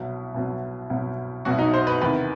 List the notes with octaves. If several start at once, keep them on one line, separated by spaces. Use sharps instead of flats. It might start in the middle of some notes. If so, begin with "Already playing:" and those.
Already playing: C2 B2 F#3
C2 B2 F#3
C2 B2 F#3
C2 B2 F#3 F#4
D#4
C5
B4
E2 C3 D#3 B4